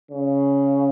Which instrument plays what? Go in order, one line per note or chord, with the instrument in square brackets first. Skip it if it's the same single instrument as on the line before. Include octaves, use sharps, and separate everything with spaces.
[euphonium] C#3